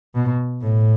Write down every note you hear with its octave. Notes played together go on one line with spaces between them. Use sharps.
B2
A2